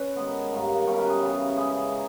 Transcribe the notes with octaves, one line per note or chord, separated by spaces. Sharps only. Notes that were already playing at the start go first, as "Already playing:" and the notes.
Already playing: C#4 B4 C#5
D#3 G#3 B3
G2 D#3 A#3
B2 G3 C#4 E4 C#5
A#4 B4
G#4
C#3 E3 G3 B3
C#3 G#3 C#4 G#4
D#4